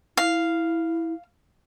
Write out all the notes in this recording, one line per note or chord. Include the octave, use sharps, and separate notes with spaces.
E4 F5